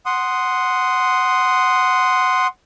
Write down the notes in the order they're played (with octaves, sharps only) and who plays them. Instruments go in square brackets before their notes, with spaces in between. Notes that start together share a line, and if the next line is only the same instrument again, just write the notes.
[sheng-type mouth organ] F#5 C6 D#6